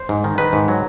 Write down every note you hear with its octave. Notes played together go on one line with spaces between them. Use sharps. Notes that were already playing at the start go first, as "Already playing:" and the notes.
Already playing: C5
G#2
D#3
D#3 B4
G#2
F#3